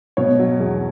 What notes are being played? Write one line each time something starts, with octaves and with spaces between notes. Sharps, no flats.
B2 C#5
F#3
E2